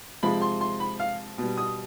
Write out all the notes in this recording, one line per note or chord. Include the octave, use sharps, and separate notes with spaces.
C3 F3 G#3 B5
C6
C6
B5
F5
B2 G3
D#6